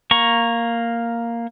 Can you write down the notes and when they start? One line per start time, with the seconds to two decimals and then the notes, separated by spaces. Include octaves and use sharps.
0.11 A#3 A#5 C#6